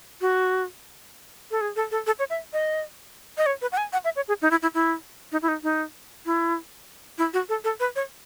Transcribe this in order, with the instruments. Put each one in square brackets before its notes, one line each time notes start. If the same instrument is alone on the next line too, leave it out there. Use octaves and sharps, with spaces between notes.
[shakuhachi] F#4
A4
G#4
A4
A4
A4
C#5
E5
D#5
D#5
C#5
B4
F#5
G#5
F#5
E5
C#5
G#4
D#4
E4
E4
E4
D#4
E4
D#4
D#4
E4
E4
F#4
A4
A4
B4
C#5